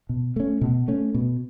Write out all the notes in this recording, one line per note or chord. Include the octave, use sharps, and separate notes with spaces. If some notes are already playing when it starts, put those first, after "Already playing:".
B2
A3 C#4
B2
A3 C#4
B2